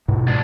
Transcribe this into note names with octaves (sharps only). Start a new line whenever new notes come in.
G#2 B2
B2 G#3 D4